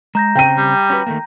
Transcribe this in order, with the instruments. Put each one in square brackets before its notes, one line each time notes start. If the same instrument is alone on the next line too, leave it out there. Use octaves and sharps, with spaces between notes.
[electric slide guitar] G#3 [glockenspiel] A#5 G6 A#6
[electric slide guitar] C#3 C4 C#4 [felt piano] G5 D#7
[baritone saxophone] G3
[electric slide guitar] C#4 F#4 B4
D#3 A3 A#3